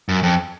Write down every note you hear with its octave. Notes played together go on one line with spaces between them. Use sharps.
F#2
F2